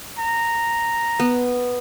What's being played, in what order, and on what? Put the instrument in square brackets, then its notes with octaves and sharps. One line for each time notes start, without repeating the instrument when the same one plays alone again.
[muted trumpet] A#5
[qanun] B3